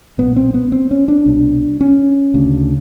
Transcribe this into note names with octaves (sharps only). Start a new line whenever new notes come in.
B1 A#2 B3
C4
B3
C4
C#4
D4
C2 B2
C#4
D2 C#3